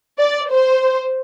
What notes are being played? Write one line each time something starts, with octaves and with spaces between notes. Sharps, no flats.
D5
C5